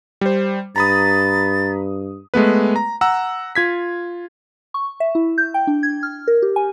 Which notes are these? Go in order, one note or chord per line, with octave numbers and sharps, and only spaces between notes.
G3 C5
G2 A#5 B5 D#6 A6
G#3 A3 B3 B4
A#5
F#5 A#5 E6
F4 G#6 B6
C#6
E5
E4
G6
G5
D4
G#6
F6
A#4
G4
G#5